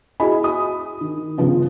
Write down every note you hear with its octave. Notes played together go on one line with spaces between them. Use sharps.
E4 F#4 G#4 D#5 G#5 B5
D#6
D#3
G2 C#3 F3 B3 F4